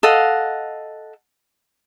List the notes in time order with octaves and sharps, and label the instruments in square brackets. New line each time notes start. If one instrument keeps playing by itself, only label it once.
[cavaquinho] A4 D#5 F5 F#5